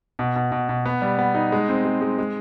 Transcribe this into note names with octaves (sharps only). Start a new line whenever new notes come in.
B2
B2
B2
B2
B3
G3
B3
D#4
G#3
C4
G#3
G#3
G#3